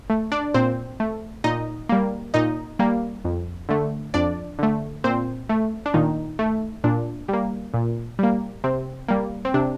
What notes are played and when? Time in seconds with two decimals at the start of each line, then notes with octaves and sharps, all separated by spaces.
0.10 A3
0.32 D4 D5
0.54 A#2 C4 C5
1.00 A3
1.44 A#2 D#4 D#5
1.89 G3 A#3
2.34 A#2 D#4 D#5
2.79 G3 A#3
3.25 F2
3.69 D3 A3
4.14 F2 D4 D5
4.59 D3 A3
5.04 A#2 C4 C5
5.49 A3
5.86 D4
5.94 A#2 D#3 D#4
6.39 A3
6.84 A#2 D4
7.28 G3 A#3
7.74 A#2
8.19 G3 A#3
8.64 C3 C4
9.08 G3 A#3
9.45 C4
9.54 C3 D4